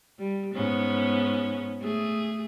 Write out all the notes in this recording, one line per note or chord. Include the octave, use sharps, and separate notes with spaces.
G3
G#2 B3 C#4
A3 G#4